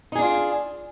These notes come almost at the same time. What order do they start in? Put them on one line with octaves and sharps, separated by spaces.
D#4 G#4 D4 F4